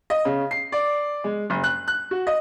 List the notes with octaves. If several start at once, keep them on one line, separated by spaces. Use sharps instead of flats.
D#5
C#3
C7
D5
G#3
F#1
F#6
F#6
F#4
D#5